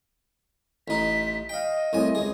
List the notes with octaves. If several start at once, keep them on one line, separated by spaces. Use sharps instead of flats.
A1 D#4 B6
D#5 F5 G5
C2 A2 G#5
C#2 G#4